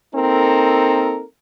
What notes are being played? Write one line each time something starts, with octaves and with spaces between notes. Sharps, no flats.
A#3 C4 D#4 A4 A#4